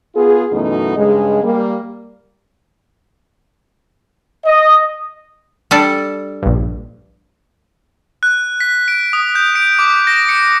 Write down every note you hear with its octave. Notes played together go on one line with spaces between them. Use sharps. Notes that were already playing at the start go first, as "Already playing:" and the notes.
B3 F4 G#4
F#2 B2 E3 A3 D#4
G2 C#3 G#3
G3 A#3
D#5
G3 D4 A4
A#1 G2
F#6
B6
D7
D#6
G6
D7
D6
A#6
C#7